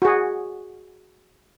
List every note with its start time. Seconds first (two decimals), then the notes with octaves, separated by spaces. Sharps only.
0.02 F#4 G#4